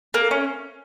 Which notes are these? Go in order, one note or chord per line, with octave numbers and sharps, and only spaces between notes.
A#3
C#4